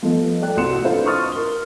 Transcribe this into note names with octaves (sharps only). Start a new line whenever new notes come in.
F3 G3 B3 D#4 A4
A4 D5 G5 F#6
C2 C4 F#4 C6 C#7 E7
D4 E4 F4 A4 B4 C5
C6 C#6 D#6 F6 A6
A#4 G7